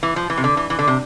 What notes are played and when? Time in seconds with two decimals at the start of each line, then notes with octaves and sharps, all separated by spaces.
0.03 E3
0.16 F3
0.30 E3
0.38 C3
0.44 D3
0.57 E3
0.70 E3
0.79 D3
0.88 C3